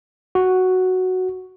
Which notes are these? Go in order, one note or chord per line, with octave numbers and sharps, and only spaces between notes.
F#4